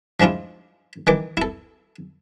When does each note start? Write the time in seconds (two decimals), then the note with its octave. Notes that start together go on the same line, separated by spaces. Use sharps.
0.20 F3 G#3 D4 E4 F4
1.07 D#3 E3 D6
1.37 E4 A4